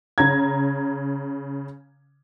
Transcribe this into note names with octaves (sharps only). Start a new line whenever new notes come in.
C#3 A#5 G#6